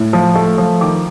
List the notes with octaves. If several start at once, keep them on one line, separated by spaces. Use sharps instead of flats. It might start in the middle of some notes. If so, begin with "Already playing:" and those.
Already playing: A2
F3
A3
F3
D#3 D6